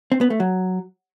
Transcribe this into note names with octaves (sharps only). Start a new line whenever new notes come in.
C4
B3
A3
F#3